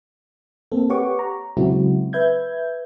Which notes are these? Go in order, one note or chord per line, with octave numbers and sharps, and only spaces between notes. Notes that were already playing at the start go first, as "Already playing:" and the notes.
A#3 C4 A4
G4 B4 C#5 F#5 C#6 D6
A#5
C#3 F#3 G#3 C4 E4 F#4
B4 E5 G6 G#6